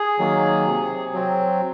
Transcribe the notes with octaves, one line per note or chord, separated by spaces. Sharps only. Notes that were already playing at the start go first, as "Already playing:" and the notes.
Already playing: G#4
D#3 F#3 A#3
C3
F#3 C4